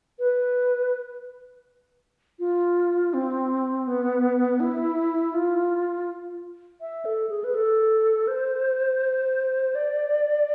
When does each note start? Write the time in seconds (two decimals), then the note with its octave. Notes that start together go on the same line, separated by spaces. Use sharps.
0.19 B4
2.39 F4
3.14 C4
3.87 B3
4.60 E4
5.34 F4
6.81 E5
7.05 A4
7.29 G#4
7.44 B4
7.54 A4
8.28 C5
9.75 D5